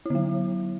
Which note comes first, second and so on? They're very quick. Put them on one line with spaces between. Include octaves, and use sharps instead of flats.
E4 D3 F#3